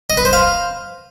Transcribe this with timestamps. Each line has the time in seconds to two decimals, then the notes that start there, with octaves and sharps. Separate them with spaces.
0.10 D#5
0.17 B4
0.25 C5
0.33 F5